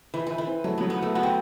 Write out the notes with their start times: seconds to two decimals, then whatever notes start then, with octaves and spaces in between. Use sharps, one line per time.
0.14 E3 B4
0.27 E3 B4
0.38 E3
0.47 C4
0.64 F#3 A3
0.78 F#3 B3
0.90 B3
0.98 A3 B4
1.15 B3 F#4
1.23 C4